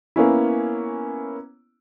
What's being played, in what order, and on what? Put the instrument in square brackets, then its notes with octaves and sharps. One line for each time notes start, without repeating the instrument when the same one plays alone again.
[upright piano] A#3 B3 C#4 E4